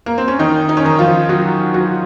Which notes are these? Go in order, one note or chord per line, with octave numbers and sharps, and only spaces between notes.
A#3
C4
C#4
D#3 D#4
D#4
C#4
D#3 D#4
F3 F4
F#3 F#4
F#3 F#4